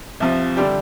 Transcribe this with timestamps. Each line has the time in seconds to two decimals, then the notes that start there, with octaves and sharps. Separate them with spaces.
0.20 C2 C3 F3
0.57 D3 G3 D4 G4